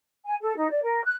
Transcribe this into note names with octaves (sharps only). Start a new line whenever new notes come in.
G#5
A4
D#4
D5
A#4
F#6